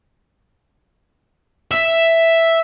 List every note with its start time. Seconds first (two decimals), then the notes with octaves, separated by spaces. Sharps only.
1.71 E5